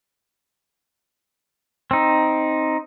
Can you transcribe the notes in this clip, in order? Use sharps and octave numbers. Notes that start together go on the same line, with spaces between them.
C4 D#4